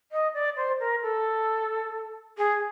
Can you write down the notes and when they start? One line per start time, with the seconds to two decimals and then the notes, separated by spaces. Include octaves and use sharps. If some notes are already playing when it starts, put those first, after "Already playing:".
0.12 D#5
0.34 D5
0.57 C5
0.80 A#4
1.02 A4
2.38 G#4